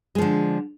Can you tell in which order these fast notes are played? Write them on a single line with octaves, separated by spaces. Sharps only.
G#3 F3 D3